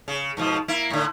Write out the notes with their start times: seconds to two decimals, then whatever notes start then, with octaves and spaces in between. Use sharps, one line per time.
0.08 C#3
0.37 G#2 B2 F3
0.68 A#3 E4
0.90 A2 D3